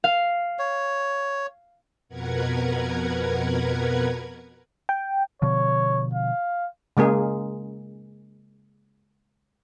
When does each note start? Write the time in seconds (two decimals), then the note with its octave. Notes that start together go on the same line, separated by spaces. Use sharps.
0.04 F5
0.59 C#5
2.09 F2 B2 A#4 B4 F#5 G#6
4.89 G5
5.42 B2 D3 F3 C#5
6.14 F5
6.97 C#3 G#3 A#3 G#4